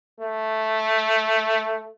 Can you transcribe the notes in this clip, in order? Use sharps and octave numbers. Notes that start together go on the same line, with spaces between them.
A3